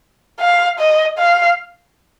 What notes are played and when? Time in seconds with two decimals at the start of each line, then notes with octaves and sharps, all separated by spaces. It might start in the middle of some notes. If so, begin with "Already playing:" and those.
0.41 F5
0.79 D#5
1.18 F5